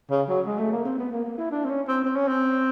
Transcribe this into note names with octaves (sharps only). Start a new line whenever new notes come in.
C#3
F#3
G#3
A3
A#3
C4
B3
A#3
A#3
E4
D4
C4
C#4
C4
C4
C#4
C4